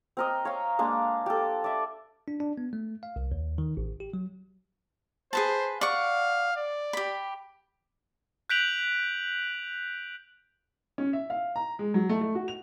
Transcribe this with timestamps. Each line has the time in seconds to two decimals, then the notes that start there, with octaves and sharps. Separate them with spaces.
0.17 C4 A#4 D#5
0.45 C#5 F5 A#5
0.79 G#3 A#3 D4 C6
1.26 G4 A4
1.64 D5 E5
2.28 D4
2.40 D4
2.58 B3
2.73 A3
3.03 F5
3.16 C2
3.32 D#2
3.58 D#3
3.77 A1
4.00 G4
4.14 F#3
5.33 G#4 B4 C5 A5
5.81 D5 F5 F#5 C#6
6.57 D5
6.93 G4 B5
8.49 F#6 G6 B6 D7 F7 F#7
10.98 C#4
11.13 E5
11.30 F5
11.56 A#5
11.79 G#3
11.94 F#3
12.09 A3
12.21 A3
12.35 F#4
12.48 F7